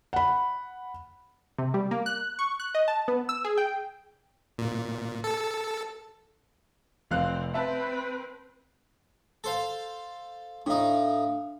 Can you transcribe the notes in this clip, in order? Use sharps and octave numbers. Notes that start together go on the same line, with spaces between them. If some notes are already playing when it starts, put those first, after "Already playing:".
F#5 B5
C3
G3
A#3
F#6
C#6
F#6
D#5
A5
B3
E6
G#4
G5
A#2
A4
F1 C4 F5 F#6
C4 B4 E5 A5
A4 C5 F5
A2 D4 D#4 F5